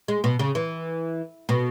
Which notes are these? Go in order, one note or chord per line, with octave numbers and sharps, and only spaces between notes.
G#3
B2
C#3
E3
B2